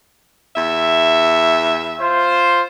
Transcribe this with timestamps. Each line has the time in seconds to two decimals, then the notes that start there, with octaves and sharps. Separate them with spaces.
0.56 E2 E5
2.00 F4 C5